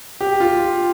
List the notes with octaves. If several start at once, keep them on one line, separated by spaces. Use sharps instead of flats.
G4
F4